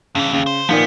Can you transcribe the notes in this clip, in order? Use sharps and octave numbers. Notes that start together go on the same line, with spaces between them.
G2 C#3 E3
D#2 C#3
C5
A#2 D#3 F3 B3